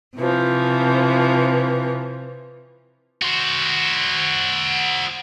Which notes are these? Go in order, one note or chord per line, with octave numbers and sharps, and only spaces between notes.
C3 E3 F3
F#4 C5